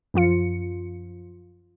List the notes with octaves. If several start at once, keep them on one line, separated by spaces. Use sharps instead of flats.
F#2 F3 F4 C#7